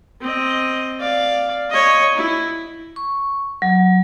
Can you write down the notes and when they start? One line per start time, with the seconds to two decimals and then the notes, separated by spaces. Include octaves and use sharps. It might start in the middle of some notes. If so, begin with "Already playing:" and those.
0.21 C4 D#5
0.99 D5 F5
1.70 C#5 D#5
2.16 E4
2.96 C#6
3.62 F#3